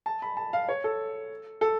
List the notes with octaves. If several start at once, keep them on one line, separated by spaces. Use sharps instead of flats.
A5
B5
A5
F5
C#5
A4
A4